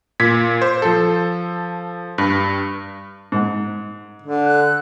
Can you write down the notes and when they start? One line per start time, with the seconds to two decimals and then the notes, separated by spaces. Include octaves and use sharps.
0.20 A#2 G#6 B6
0.62 C5
0.82 F3 A4
2.18 G2
3.32 G#2
4.22 D3
4.44 F#6